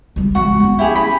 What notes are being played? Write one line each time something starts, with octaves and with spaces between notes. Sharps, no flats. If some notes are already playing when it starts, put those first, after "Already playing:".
C#2 G3
F3 G#3 F#4
B3 C#4
E4 G4 G#4
B5